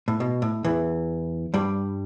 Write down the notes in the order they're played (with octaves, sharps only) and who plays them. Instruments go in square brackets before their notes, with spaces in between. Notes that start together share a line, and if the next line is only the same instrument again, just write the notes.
[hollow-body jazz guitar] A2
B2
A2
E2 E3
G2 G3